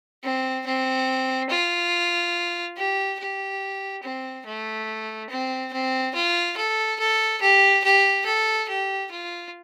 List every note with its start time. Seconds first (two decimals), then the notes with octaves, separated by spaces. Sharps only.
0.23 C4
0.66 C4
1.50 F4
2.77 G4
3.19 G4
4.03 C4
4.46 A3
5.30 C4
5.73 C4
6.14 F4
6.57 A4
6.99 A4
7.41 G4
7.84 G4
8.26 A4
8.68 G4
9.11 F4